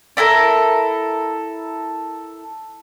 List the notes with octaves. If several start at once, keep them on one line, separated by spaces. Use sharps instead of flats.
D4 E4 A4 A#4